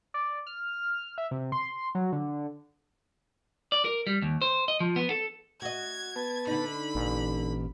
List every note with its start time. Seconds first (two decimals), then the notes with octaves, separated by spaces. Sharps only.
0.14 D5
0.47 F6
1.18 E5
1.31 C3
1.52 C6
1.95 F#3
2.12 D3
3.72 D5
3.85 A#4
4.07 G3
4.22 D#2
4.42 C5
4.68 D#5
4.80 F3
4.96 B3
5.10 A4
5.62 F#4 D#5 G#6
6.16 B3 B4 A5
6.47 D3 D#4 B5
6.95 A1 A#2